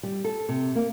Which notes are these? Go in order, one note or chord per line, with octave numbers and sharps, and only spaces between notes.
G3
A4
C3
A#3